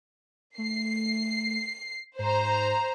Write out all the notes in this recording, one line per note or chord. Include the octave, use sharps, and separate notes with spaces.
A3 C7
G#2 C5 A#5